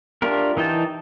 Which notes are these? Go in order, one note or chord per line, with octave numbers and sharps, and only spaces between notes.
A3 D4 F4 G4 A#4
E3 D#4 G5 A5